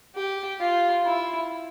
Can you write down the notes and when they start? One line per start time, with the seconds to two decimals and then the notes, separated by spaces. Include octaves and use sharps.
0.16 G4
0.60 F4
1.04 E4